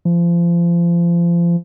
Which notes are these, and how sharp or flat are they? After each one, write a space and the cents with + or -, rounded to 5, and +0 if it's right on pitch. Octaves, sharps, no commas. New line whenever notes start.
F3 -30